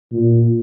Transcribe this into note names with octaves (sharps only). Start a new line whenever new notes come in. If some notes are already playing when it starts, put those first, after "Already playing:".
A#2